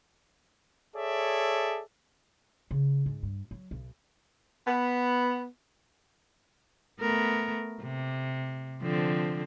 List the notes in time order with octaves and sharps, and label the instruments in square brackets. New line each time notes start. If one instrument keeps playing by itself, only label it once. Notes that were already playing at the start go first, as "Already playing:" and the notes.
[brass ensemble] G#4 A4 C#5 D5 E5
[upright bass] C#3
G#2
G2
F#3
B1
[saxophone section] B3
[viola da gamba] A3 B3 A#4
C3
D3 F3 C4